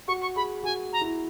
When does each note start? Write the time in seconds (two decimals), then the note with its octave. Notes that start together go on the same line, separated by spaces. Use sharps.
0.07 F#4 C#6
0.21 C#6
0.35 G#4 B5
0.63 F#4 G#5
0.92 A#5
1.01 E4